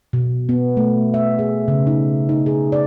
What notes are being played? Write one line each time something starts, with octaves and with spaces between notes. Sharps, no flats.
B2
B3
A3
E5
G#4
C#3
D#4
D#4
G#4
D5